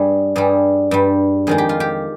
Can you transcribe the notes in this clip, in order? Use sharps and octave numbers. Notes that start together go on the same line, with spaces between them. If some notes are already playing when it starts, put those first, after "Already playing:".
Already playing: G2 G3 G#4
G2 G3 G#4
G2 G3
F2 D#3 G#3 G#4
G4
F4
G4